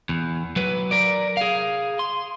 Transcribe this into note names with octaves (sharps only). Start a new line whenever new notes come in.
E2
F#3 B4
A#4 D5
G#4 F5
C6